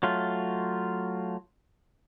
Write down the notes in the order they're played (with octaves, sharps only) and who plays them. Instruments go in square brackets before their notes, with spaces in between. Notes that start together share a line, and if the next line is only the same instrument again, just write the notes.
[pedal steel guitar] F#3 A3 F4